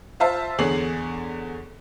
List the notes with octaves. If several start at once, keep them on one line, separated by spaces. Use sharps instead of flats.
F4 C5 E5 F5 A5
E2 D3 G#4 C#5 C7 F#7